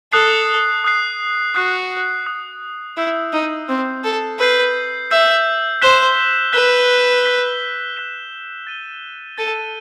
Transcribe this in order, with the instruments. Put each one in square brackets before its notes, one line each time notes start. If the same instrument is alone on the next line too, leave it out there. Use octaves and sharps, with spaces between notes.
[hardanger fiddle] A4 [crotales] D#6 F#6 C7
[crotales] D#6 F#6 C7
[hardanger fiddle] F#4 [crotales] D#6 F#6 C7
[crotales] D#6 F#6 C7
[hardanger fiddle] E4 [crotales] E6 G6 C7
[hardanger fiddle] D#4
[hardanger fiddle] C4 [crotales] E6 G6 C7
[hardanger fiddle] A4
[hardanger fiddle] B4 [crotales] E6 G6 C7
[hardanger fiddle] E5 [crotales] E6 G6 C7
[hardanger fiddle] C5 [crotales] F#6 B6 E7 G7
[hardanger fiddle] B4 [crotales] F#6 B6 E7 G7
[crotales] F#6 B6 E7 G7
F#6 B6 E7 G7
A6 D#7 G7
[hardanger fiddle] A4 [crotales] A6 D#7 G7